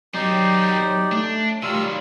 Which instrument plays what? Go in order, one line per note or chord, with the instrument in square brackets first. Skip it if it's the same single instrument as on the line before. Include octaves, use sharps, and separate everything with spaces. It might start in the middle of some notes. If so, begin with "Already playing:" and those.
[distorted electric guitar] D#3 C4 [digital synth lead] F#3 [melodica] D#4 G4 D5
[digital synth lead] A3 [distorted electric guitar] D4
[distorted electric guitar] D#3 F#3 [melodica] G3 F4 E6